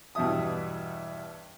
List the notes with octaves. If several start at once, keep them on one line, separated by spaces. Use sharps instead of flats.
E2 G2 B2 E5 D#6